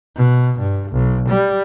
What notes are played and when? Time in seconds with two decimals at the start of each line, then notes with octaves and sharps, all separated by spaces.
0.16 B2
0.60 G2
0.92 B1
1.29 G3